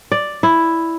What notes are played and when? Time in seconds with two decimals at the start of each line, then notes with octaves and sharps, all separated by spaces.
0.12 D5
0.43 E4